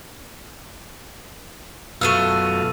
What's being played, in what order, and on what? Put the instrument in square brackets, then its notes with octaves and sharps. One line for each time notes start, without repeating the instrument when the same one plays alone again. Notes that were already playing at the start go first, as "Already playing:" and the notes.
[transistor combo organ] F#2 B2 F4 [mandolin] A3 B3 F5 [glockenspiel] E6 D#7